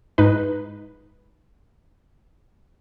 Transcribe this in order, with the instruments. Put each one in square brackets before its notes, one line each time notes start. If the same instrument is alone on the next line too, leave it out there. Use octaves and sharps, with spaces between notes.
[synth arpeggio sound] G#2 D#4 B4